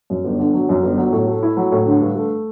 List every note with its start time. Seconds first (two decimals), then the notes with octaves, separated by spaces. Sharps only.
0.10 F#2
0.24 G1
0.39 D3
0.54 F#3
0.69 F#2
0.83 G1
0.97 F#3
1.13 A2
1.27 A3
1.43 E4
1.57 F#3
1.72 A2
1.86 D3
2.01 G2
2.15 A3